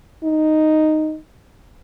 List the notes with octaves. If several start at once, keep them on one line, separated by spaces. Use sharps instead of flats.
D#4